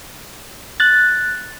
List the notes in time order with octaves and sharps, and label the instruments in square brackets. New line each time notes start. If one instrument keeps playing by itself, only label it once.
[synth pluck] F#6 A6